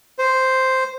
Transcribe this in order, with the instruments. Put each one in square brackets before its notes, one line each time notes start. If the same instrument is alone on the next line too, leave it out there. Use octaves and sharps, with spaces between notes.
[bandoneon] C5